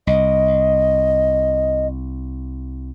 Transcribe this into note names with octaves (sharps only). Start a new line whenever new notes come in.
C2 D#5